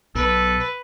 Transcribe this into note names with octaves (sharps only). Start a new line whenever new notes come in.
B1 A4 B4